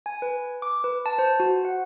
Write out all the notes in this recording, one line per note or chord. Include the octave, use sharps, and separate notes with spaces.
G#5
B4
D6
B4
A5
C5
F#4
F#5